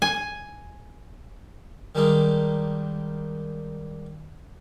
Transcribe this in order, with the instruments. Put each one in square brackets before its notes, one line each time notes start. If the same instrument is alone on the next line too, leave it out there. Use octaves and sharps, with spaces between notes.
[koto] G#5
[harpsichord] D#3 G3 G#3 A#3 D4 D#4